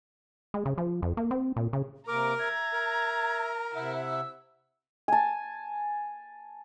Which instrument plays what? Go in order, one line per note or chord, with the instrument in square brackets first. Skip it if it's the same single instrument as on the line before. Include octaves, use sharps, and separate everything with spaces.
[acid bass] G#3
C#3
F3
F2
A#3
C4
A#2
C#3
[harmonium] C3 A#3 [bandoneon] A#4 [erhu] A#5 [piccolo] D6
[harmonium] E5 [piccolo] G#6
[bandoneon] A#4
[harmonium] C3 E5 F#5 [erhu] E4
[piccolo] E6
[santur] G#5 A5